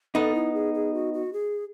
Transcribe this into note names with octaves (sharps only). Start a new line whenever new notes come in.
B3 D#4 A4
E4
G#4
G#4
F#4
F#4
G#4